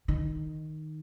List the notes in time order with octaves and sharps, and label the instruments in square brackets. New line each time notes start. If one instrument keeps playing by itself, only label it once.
[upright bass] D#3